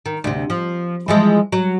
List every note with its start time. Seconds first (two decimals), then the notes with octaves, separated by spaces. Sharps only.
0.06 D#3
0.24 D2 C3
0.50 F3
1.08 E3 F3 G#3
1.52 F#3